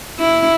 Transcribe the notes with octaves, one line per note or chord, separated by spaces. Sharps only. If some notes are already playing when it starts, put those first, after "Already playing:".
E4